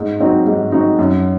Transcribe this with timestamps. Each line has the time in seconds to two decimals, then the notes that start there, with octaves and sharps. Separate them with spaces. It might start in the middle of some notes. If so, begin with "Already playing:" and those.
Already playing: G#2
0.20 F#3 C4 D#4 F#4
0.47 G#2
0.72 F#3 C4 D#4 F#4
0.98 F#2